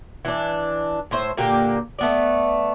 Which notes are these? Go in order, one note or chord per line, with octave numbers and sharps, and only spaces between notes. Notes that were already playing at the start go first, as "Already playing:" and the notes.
E3 D4
A2 C5 E5
A#2 D3 A#3 G4
A3 B3 D5